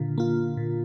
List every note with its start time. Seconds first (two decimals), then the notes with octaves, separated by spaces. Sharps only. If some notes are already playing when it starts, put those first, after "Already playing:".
Already playing: A#2 D3 A#3 F4
0.18 A#3 F4
0.57 A#2